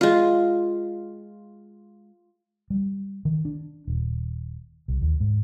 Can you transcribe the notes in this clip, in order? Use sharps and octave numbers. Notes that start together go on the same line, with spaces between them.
G#3 F4
G3
D#3
D4
D#1
C2
D#2
G#2